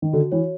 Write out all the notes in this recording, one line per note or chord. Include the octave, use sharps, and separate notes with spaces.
D#3
D3 F#4
E3 C#5